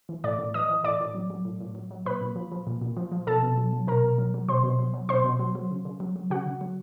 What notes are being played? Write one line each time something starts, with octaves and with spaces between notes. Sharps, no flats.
E3
A2 D5 D6
A2
E3 D#5 D#6
E3
A2 D5 D6
A2
F#3
F#3
A2
A2
F#3
F#3
A#2 B4 B5
A#2
F3
F3
A#2
A#2
F3
F3
B2 A4 A5
B2
F#3
F#3
B2 A#4 A#5
B2
F#3
F#3
B2 C5 C6
B2
F#3
F#3
B2 C5 C6
B2
F#3
F#3
C#3
C#3
F#3
F#3
C#3 F#4 F#5
C#3
F#3